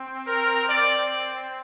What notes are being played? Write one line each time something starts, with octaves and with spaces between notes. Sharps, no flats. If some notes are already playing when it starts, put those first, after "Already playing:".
Already playing: C4
A#4
D5